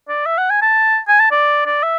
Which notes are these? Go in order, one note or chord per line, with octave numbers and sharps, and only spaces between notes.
D5
E5
F#5
G#5
A5
G#5
A5
D5
D5
E5